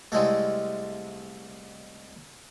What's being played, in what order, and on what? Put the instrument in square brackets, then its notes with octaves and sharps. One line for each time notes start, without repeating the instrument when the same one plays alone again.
[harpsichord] C2 G#3 A3